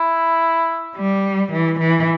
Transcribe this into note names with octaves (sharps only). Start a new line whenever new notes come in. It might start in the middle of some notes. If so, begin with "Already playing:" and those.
Already playing: E4
G3
E3
E3